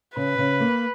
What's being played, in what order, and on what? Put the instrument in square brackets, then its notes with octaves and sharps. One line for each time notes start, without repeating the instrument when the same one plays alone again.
[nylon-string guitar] C#3 [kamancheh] B4
[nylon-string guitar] C#3
A#3